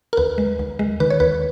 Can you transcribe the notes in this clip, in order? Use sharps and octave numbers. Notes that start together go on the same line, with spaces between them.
A#4
D#2 B4
G#3
D#2
G#3
D#3 B4
C#5
D#2 B4